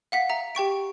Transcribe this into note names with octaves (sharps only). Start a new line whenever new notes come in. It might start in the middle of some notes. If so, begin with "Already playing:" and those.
F5 F#5 B6
E5 A#5
G4 G5 C#6 D7